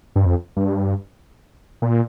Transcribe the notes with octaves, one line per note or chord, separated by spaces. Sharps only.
G2
F2
G2
A#2